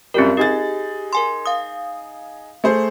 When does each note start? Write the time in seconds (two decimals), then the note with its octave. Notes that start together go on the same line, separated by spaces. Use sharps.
0.14 F#2 G3 C4 F4 A#4
0.37 D#4 G4 G#4 A6
1.13 A#4 G#5 C6
1.46 F5 D#6
2.64 A3 G#4 C5